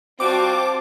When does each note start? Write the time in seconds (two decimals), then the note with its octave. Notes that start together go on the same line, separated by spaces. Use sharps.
0.20 C3 G3 C4 F4 F#4 A5 D6